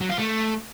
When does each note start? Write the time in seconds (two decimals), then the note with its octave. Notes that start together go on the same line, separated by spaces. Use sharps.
0.01 F#3
0.09 F4
0.18 A3